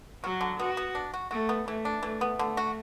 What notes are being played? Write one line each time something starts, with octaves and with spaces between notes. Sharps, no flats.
F#3 F#4
D3
B3 F#4
B3
D4
F#4
A3 F#4
B3
E3 A3
D4
E3 A3
B3
D3 A3
F#4